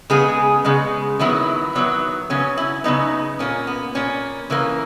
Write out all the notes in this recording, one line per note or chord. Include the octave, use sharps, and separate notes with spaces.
C#3 G#3 B3 G#4
C#3 G#3 B3
D#3 F#3 B3 E4
D#3 F#3 B3
C#3 F#3 B3 C#4
E4
C#3 F#3 B3 D#4
A#2 A#3 C#4
B3
A#2 A#3 C#4
C#3 E3 A#3